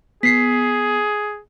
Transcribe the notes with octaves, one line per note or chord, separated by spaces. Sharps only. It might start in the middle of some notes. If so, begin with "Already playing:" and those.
B3 G#4 B6 C7